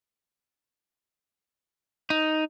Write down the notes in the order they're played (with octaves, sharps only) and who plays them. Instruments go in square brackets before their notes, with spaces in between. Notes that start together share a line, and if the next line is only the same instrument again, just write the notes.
[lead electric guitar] D#4